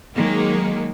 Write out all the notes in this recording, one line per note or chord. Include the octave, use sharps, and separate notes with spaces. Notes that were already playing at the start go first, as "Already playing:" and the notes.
D#3 F#3 G#3 A#3